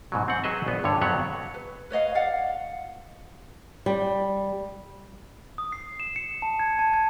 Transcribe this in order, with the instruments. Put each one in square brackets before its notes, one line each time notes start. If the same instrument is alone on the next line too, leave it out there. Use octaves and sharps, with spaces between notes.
[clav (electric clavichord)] G#2 B2 F#3
C4 F#5
F#3 G#4 B4 D#5 E5
A#1 B3
G2 D3 C#5
F2 F#3 B3 C#5 F#5
[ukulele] B4
B4 C#5 D#5 F5
D5 F5 F#5
[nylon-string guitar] G3
[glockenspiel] D#6
C7
E7
C#7
A5
G#6
A5
G#6